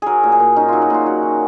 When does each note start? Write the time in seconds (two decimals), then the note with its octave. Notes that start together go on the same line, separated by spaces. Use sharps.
0.02 F#3 G#4 A#4
0.24 A#2
0.32 G#4
0.40 A#2
0.56 C#4 D#4
0.68 F#3 F4
0.82 F#4
0.90 A#2 F4
1.06 F#3 F#4
1.23 D#3